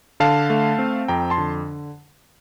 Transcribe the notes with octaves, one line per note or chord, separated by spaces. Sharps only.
D3 F5 A5
A3
C4
F2 G5 A#5
A5 C6
D3